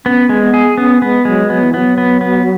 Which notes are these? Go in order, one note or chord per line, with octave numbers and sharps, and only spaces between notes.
B3 C#4
G#3
B3
G#4
B3 C#4
G#3 B3
F#3 G#3
F#3 B3
E3
F#3 B3
B3
B3